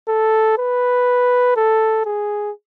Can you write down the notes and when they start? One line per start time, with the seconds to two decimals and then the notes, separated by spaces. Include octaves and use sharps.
0.08 A4
0.58 B4
1.56 A4
2.05 G#4